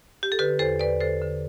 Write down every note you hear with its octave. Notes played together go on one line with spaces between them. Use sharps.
G4
A4
D3 G4 B4
E2 A4 C5
E2 B4 D5
D3 A4 C5
D3